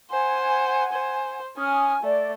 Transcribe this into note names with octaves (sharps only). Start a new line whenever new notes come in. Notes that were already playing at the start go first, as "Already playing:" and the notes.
C5 F#5 G#5
C5
C#4 G#5 D#6 F6
A3 D5